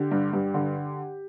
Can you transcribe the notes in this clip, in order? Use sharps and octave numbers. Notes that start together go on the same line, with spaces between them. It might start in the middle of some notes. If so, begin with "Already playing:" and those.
Already playing: D3 G4
G2
G2
D3